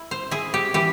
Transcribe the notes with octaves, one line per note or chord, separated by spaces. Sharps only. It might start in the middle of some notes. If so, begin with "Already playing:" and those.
Already playing: E4
C5
E4 G#4
G4
E3 G4